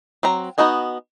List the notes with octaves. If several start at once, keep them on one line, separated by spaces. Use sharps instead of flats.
F#3 C4 A#5
B3 D#4 F#4 D#5 G#5